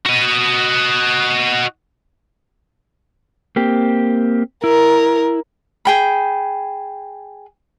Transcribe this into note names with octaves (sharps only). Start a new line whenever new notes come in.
F#4 D#5
A#3 C4 G4
E4 A#4
G#4 G5 B5